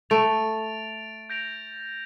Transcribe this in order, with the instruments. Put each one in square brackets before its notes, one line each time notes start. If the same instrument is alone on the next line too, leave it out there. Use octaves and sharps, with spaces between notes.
[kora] A3 [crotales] A6 D7 F7
[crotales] G6 A#6 D7 F7